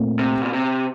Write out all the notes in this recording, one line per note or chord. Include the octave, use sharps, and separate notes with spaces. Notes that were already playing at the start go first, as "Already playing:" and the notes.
Already playing: A#2 A3 C4
C3
A#2
C3